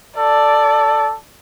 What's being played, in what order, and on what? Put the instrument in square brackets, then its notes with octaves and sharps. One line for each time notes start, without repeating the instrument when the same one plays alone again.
[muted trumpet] A4 [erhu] D5